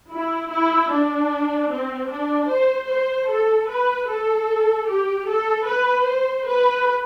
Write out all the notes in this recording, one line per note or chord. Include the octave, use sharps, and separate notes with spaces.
E4
E4
D4
C4
D4
C5
C5
A4
B4
A4
G4
A4
B4
C5
B4